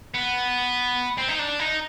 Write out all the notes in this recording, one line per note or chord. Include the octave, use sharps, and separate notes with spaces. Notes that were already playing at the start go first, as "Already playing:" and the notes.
B3
C4
D#4
D4
D#4